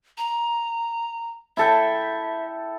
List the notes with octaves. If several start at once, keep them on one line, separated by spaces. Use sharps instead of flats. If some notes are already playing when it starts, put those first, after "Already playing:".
A#5
E4 A4 E5 G5